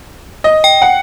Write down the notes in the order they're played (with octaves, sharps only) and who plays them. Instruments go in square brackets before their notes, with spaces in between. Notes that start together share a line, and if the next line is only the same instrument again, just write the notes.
[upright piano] D#5
[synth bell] G5
[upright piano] F#5